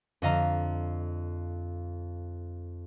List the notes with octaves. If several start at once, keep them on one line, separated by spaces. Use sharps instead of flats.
F2 D3 D#5 F5 A#5